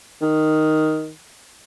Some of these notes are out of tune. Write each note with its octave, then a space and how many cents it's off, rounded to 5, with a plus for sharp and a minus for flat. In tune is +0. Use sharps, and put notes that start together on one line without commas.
D#3 +0